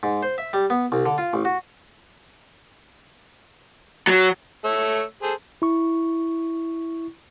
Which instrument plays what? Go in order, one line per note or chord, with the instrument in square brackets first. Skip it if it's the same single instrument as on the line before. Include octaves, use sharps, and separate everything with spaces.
[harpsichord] G#2
C5
E5
G3
B3
C2
D3
F4
A1
F#4
[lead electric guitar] F#3
[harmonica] A3 C#5 E6
G#4 A4 C5
[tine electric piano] E4 C#6